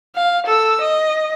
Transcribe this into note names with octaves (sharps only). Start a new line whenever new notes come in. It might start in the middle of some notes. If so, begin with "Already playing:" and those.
F5
A4 E6
D#5